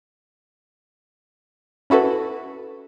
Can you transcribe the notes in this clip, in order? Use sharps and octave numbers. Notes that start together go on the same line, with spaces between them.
C#4 E4 F#4 A4 B4